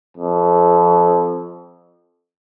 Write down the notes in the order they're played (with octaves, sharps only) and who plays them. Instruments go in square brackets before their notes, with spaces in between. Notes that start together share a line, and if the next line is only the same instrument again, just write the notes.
[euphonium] F2